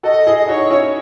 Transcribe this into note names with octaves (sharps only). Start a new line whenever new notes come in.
F#4 A4 D#5
E4 G#4
D#5
D#4 F#4 C#5
C#4 E4